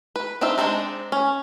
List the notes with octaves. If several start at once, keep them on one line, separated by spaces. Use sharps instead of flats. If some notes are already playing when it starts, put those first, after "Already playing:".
B4
C4 D4 D#4 F4 E5
G#3 A3 C4 D4 D#4
C#4